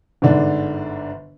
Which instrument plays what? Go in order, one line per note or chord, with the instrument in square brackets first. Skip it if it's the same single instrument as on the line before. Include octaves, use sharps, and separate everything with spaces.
[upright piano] G1 G#2 D3 D4